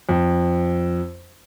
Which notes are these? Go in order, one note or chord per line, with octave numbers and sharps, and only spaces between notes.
F2